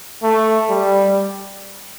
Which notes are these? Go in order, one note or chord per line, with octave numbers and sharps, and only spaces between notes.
A3
G3